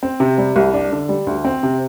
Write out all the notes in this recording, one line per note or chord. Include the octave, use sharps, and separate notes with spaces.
C4
C3
G3
C2
D4
D3
G3
D2
C4
C3